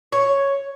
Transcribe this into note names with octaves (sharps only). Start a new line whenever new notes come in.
C#5